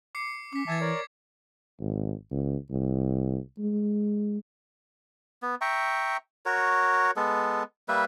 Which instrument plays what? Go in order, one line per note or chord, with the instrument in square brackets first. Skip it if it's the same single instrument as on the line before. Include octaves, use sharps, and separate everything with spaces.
[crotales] D6 C7 C#7
[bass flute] C#4 [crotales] D6 B6
[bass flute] E3 [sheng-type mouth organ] E5 G#5 A5 [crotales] D6 G#6 A6
[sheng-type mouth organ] A#4 C#5 D5
[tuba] G#1
C#2
C2
G#3
[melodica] B3
E5 G5 A#5 C#6
F#4 A#4 C#5
G#3 B3 A4
G3 A#3 B4 E5